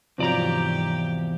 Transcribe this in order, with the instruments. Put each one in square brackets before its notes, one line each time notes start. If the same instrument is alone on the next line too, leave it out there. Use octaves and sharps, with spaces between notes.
[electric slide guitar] E2 D5 A#5 [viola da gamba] G#2 G4 [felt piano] C3 F3 F#3